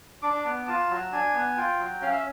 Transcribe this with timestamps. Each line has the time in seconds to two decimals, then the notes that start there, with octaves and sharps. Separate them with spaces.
0.22 D4 D6
0.45 B3
0.68 F4 A5
0.91 F#3
1.12 D4 G#5
1.34 B3
1.57 F4 G5
1.79 F#3
2.01 C#4 F5
2.13 E5